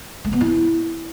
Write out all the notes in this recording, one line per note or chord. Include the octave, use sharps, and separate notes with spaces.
A3
B3
E4